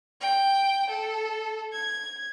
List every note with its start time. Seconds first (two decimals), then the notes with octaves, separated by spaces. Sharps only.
0.21 G5
0.89 A4
1.73 G#6